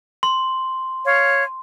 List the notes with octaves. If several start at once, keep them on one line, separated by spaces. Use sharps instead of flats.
C6
C#5 F5